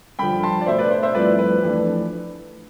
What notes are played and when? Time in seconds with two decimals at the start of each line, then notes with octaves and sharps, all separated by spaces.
0.19 G2 D3 F3 G5 B5
0.43 A5 C6
0.61 D5
0.66 B2 A3 D4 C5 E5
0.78 B4 D5
0.91 C5
1.03 C5 E5
1.15 G2 F3 A3 C4 E4 B4 D5
1.39 B4
1.63 F2 E3 A3 D4